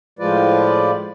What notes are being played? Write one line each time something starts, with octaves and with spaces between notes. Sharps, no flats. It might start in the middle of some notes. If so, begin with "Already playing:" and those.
A2 F3 G#3 F4 B4 D5